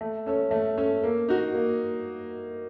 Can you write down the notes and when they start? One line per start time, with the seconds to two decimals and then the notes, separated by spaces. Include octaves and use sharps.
0.01 A3
0.26 C#4 A4 C#5
0.51 A3
0.77 C#4 A4 C#5
1.03 A#3
1.29 D#4 F#4
1.54 A#3